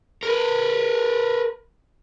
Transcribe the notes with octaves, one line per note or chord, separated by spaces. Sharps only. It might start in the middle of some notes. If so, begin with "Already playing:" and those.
A#4 B4